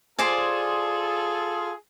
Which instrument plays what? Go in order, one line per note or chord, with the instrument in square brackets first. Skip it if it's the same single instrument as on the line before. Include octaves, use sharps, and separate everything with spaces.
[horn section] F4 G#4 A4 [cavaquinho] C5 D5 G#5